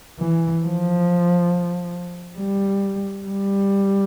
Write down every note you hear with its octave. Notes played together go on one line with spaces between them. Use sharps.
E3
F3
G3
G3